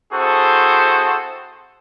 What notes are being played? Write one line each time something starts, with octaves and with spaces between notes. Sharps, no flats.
C4 E4 F#4 G#4 A4 C5